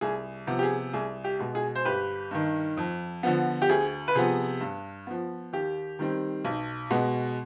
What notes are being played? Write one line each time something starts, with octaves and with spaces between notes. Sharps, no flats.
C2 G#4
C3 F3 B3
G4
G#4
C2 G#4
G4
B2 G#3
G#4
C5
G1 G4 B4
G2 D#3
F2
D3 F3 B3
G4
D2 G#4
B4
C3 F3 B3 G#4
G2
F3 B3
D#2 G4
D#3 G3 C4
B1
B2 G#3 B3